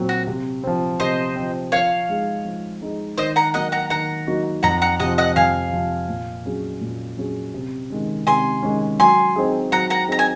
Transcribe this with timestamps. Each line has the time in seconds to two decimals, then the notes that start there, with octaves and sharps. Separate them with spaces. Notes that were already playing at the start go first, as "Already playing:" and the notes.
Already playing: A#2 F#3 C4
0.09 F#4
0.27 C3
0.64 F3 C4
1.00 C3 C5 D#5
1.36 F3 C4
1.72 F3 C#5 F5
2.09 G#3 D#4 G#4
2.45 F3
2.82 G#3 D#4 G#4
3.18 D#3 C5 D#5
3.36 F#5 A#5
3.54 F#3 A#3 D#4 F#4 D#5 F#5
3.72 F#5 A#5
3.90 D#3 F#5 A#5
4.27 F#3 A#3 D#4 F#4
4.63 F2 F#5 A#5
4.82 F#5 A#5
5.00 C3 F3 D#5 F#5
5.18 D#5 F#5
5.36 F2 F5 G#5
5.73 C3 F3
6.09 A#2
6.45 F#3 C#4 G#4
6.81 A#2
7.17 F#3 C#4 G#4
7.54 C3
7.90 D#3 G#3 C#4
8.27 C3 G#5 C6
8.63 D#3 G#3 C#4
8.99 F#3 G#5 C6
9.36 C4 D#4 G#4
9.72 F#3 F#5 A#5
9.90 F#5 A#5
10.08 C4 D#4 G#4 A#5
10.19 G#5